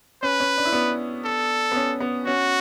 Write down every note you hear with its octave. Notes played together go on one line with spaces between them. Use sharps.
C#4 B4
C#4
D4
E4
B3 D4
A4
B3
C#4
B3
C#4 F#4